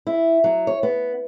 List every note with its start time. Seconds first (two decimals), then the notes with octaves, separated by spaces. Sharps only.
0.07 E4
0.44 F#3
0.67 C#5
0.83 B3